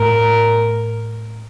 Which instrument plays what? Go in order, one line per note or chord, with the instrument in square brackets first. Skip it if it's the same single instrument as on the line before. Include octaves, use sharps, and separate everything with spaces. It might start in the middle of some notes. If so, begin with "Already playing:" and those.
Already playing: [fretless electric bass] A2 [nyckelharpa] A#4